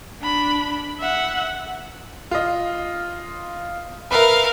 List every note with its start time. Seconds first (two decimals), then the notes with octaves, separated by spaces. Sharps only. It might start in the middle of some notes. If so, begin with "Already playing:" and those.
0.22 D4 B5
1.00 E5 F#5
2.31 F4 D#5
4.11 A#4 B4 E5 F5